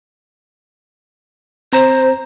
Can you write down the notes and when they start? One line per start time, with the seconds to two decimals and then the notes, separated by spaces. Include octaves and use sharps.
1.73 C4 C5 A#5